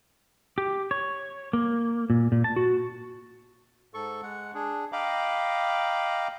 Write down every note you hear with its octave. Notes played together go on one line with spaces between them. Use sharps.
G4
C#5
A#3
A#2
A#2
A5
F#4
G#2 A4 C#6
G#3 F#5
D4 G#4
D#5 F5 G5 A#5 B5 D6